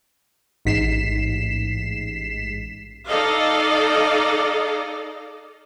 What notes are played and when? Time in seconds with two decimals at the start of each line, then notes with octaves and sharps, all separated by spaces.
0.65 A1 G#2 B6 C7 E7
3.06 D#4 A4 D5 D#5 F5